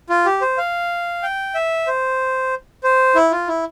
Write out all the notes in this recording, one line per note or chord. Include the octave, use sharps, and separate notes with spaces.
F4
G4
C5
F5
G5
E5
C5
C5
E4
F4
E4